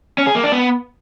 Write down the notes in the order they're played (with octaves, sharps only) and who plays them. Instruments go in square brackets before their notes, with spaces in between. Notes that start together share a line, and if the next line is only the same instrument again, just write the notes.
[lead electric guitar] C#4
G#4
A#3
D4
B3